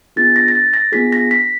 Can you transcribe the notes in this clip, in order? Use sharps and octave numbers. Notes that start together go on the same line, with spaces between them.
B3 D4 F4 G#4 A6
A#6
A#6
A6
A#6
B3 D4 F4 G#4 B6
A#6
B6